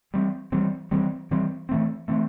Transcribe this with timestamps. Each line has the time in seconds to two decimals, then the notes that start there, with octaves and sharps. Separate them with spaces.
0.14 E3 G3 C4
0.52 E3 G3 C4
0.91 E3 G3 C4
1.31 E3 G3 C4
1.69 E3 A3 C4
2.08 E3 A3 C4